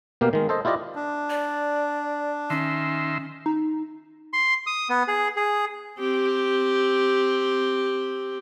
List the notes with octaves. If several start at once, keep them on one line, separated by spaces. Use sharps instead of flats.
B2 A#3 G4 F5
D#3 G#3
A4 C5 D#5
E4 F4 G4 D5 D#5
D4
D5
D#3 C#4 E5 C6
D#4
C6
D#6
B3
G#4
G#4
C4 G4